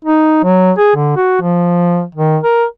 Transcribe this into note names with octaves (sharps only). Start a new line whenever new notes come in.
D#4
F#3
G#4
D3
F#4
F3
D#3
A#4